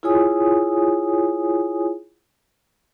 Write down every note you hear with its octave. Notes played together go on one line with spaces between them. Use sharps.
E4 F4 G#4 C#5 G#5 D#6